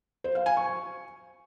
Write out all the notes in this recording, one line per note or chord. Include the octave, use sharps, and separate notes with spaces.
C5
F5
G#5
C#6